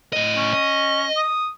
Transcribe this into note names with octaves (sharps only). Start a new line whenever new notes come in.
A2 D#5
C#4
D#5
D#6